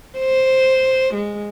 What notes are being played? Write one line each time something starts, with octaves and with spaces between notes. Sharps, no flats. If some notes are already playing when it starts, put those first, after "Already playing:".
C5
G#3